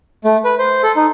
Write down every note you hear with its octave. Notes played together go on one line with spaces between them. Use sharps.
A3
B4
C5
A4
D#4